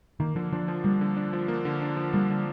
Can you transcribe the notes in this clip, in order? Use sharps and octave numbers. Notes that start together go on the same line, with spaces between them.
D#3 A#3
D3 F3
F3 D4
F3
G3 A#3
D3
D4
F3
A#3
D3
D4
F3
G3 A#3
D3